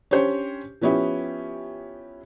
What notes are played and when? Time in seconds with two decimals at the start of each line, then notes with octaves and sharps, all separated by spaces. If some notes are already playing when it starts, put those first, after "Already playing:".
0.11 C#4 D4 G4 C5 C#5
0.81 F3 B3 C#4 E4 G4